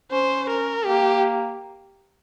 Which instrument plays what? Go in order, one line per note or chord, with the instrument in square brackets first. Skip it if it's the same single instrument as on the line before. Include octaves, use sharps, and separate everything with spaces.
[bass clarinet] C#4 [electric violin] C5
[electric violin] A#4
[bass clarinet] A#3 [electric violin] G4